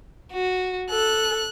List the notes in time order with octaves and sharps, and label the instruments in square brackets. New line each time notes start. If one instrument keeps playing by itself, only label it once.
[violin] F#4
[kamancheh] A4 [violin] F#6